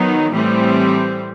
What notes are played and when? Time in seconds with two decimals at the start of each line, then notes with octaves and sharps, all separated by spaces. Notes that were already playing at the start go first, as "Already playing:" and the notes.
Already playing: D#3 F#3 B3 D#4
0.33 A2 E3 G3 C4